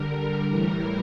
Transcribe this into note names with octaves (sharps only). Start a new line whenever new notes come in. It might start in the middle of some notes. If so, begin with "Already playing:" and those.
Already playing: D3 G3 A#4
A2 E3 G3 A#4